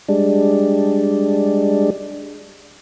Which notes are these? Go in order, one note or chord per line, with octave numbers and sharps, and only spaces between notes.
G3 G#3 D4